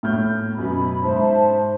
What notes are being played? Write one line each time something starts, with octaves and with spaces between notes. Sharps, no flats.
A2 F6 G6
F#2 B2 B5
G#2 C5 E5 A5